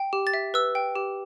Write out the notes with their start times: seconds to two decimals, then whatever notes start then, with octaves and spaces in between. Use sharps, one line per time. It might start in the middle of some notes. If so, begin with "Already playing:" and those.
Already playing: G5
0.13 G4
0.27 A6
0.34 E5
0.54 B4 E6
0.75 G5
0.96 G4